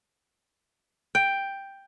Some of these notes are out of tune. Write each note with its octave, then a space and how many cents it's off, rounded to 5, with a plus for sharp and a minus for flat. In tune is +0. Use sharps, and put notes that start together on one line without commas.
G5 +5